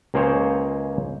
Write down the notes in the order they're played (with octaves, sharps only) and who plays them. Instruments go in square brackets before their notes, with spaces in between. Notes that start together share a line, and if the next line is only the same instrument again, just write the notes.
[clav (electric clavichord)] C#2 A#3 G#4 C5 C#5 G5